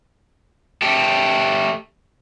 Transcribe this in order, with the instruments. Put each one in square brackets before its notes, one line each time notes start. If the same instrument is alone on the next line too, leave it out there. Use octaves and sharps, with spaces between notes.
[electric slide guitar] A3 G4